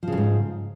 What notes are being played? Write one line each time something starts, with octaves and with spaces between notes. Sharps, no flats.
F2 G#2 C#3 F3